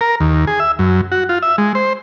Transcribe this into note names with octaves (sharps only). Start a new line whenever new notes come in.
A#4
D#2
G#4
E5
F#2
F#4
F4
E5
G#3
C5